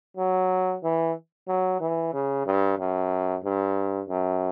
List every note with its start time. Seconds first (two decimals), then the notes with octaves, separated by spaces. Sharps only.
0.17 F#3
0.83 E3
1.48 F#3
1.81 E3
2.13 C#3
2.46 G2
2.79 F#2
3.44 G2
4.09 F#2